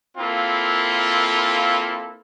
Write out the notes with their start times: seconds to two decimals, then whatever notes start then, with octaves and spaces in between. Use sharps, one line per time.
0.18 A#3 C4 E4 F4 A4